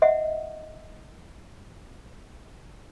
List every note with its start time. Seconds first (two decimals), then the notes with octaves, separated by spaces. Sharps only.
0.02 D#5 E5 F#5